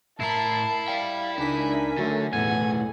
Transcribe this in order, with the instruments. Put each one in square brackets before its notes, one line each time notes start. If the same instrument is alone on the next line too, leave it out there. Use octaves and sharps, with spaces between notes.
[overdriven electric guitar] A2 A#5 [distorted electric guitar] E4 [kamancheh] A#4 A5 [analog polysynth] C7
[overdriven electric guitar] D5 G5 [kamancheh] F5
[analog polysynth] C#2 D4 B6 [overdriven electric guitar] D#4 [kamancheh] A#4 G#5
[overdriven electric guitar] D3 [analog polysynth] F#3 A3
[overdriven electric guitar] B1 A3 [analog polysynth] E2 A2 [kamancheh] B3 F#5 [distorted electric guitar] G#5